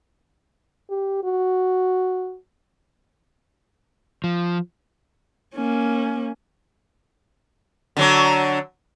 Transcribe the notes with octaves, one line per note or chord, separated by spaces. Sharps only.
G4
F#4
F3
A#3 C#4
D3 F#3 D4